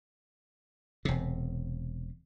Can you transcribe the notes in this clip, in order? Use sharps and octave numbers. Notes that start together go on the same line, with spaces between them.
E1 C3